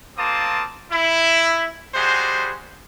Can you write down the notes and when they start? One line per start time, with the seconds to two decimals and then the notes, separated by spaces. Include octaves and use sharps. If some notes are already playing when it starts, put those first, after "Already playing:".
0.17 A#3 C4 F4 A5 D6 D#6
0.91 E4
1.94 G3 G#3 F#4 G#4 C5